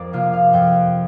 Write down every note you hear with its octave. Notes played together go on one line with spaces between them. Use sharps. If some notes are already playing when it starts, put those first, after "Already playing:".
Already playing: F2 A#4 C5 D5
C3 A#3 F4 F5
F5
F2 G5